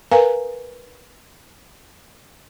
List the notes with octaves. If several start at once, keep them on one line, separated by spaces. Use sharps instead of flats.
A#4 B4 F5 G#5 A#5